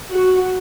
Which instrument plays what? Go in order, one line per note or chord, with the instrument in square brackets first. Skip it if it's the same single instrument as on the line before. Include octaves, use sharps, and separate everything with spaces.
[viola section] F#4